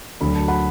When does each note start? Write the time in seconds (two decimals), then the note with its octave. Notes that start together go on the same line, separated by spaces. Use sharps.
0.21 D2 D3 F#3 B5
0.35 A5
0.48 F#5 B5